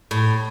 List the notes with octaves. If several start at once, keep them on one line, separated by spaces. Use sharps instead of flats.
A2